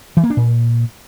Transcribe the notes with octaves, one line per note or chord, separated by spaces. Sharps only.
E3
A#3
D4
A#2